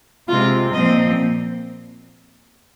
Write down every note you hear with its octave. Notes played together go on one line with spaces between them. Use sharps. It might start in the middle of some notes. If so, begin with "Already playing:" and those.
C3 G#3 C4 F4
A#2 F3 C4 D#5